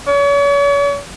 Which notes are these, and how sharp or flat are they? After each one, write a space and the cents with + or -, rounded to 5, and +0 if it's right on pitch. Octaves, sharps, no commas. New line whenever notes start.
C#5 +40